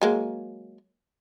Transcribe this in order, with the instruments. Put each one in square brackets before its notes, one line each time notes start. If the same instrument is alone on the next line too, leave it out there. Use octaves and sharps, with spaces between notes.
[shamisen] F#3 G#3 A#3